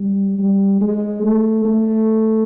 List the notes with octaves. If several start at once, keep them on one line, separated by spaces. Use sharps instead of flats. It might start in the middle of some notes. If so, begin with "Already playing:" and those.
Already playing: G3
G3
G#3
A3
A3